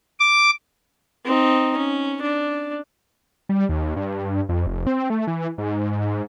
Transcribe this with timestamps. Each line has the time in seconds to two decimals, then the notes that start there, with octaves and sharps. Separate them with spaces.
0.20 D6
1.25 C4 D#4
1.77 C#4
2.22 D4
3.49 G3
3.69 D#2
3.96 G2
4.49 F2
4.67 F1
4.87 C4
5.10 A3
5.27 E3
5.58 G#2